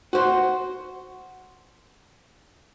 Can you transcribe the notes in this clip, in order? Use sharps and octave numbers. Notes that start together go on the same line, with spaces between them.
F#4 C5